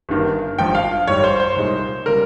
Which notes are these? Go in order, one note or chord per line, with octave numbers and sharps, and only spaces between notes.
G1 G2 D#3 A#3
G#1 G2 F3 G5
F5
G#1 G#2 G3 C#5
C5
C5
C2 A#2 G#3 D#4
C#3 G3 A#4